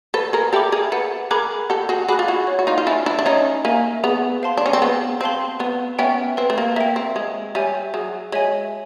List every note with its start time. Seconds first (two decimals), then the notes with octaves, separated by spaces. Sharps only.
0.14 A4 B4 C5
0.33 G#4 A#4
0.53 G4 A4 E5 G5 B5 D6
0.72 G#4 A#4
0.92 A4 B4 F#5
1.31 G#4 A#4 B5 D6 F#6
1.70 G4 A4 F#5
1.89 F#4 G#4
2.08 F#4 G#4 B5 D6 F#6
2.19 F4
2.28 E4 F#4
2.47 C#5
2.59 F#4
2.67 D#4 F4
2.78 F4
2.87 D4 E4 E5 G#5
3.06 D4 E4
3.19 D4
3.25 C#4 D#4 C#5
3.65 A#3 E5 G#5
4.04 B3 G#4
4.42 C5 F5 A5 C6
4.57 D4
4.66 C#4
4.73 C4
4.82 B3 G#4
5.21 C4 C5 F5 A5 C6
5.60 B3 B4
5.99 B3 C#4 E5 G5
6.37 C4 B4
6.50 A3
6.58 A#3
6.76 A#3 E5 G5
6.96 C4
7.16 G#3 G#4
7.55 G3 C#5 E5 G#5
7.94 F#3 G#4
8.32 G#3 C#5 E5 G#5